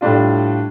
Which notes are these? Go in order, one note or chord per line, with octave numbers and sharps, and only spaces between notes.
A2 G3 D4 F4